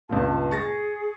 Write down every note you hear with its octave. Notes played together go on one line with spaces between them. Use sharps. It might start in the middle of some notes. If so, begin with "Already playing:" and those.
C#2 G2 A#2 A5
G#4 C#6 A6 A#6